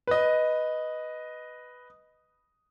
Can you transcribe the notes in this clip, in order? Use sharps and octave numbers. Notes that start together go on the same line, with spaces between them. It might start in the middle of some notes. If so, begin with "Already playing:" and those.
B4 D#5